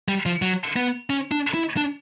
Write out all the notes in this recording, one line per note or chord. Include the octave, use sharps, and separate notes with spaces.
G3
F3
F#3
B3
C#4
D4
E4
D4